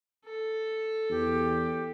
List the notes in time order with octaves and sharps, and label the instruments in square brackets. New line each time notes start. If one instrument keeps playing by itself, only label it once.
[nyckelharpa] A4
[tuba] E2 [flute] G4